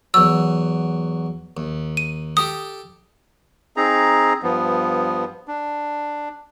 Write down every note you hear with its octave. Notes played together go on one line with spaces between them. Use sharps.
E2 F#3 E6
D#2
D#7
G4 A4 G5 D#6
C4 D#4 G#4 A#5
G2 F3 B3
D4